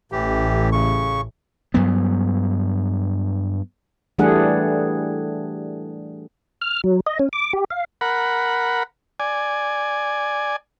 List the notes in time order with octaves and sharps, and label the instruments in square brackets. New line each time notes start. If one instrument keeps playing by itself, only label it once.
[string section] A1 [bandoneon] A2 E3 G4
[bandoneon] C#3 C#6
[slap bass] G2 F#3 B3
[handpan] E3 G3 A3 D4 G#4 F#5
[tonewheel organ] F6
F#3
D#5
C#4
D6
G4
F5
[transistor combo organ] A#4 F#5 B5
D5 G#5